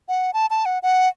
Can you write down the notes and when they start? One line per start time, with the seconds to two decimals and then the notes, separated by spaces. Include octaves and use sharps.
0.08 F#5
0.34 A5
0.50 A5
0.66 F#5
0.83 F#5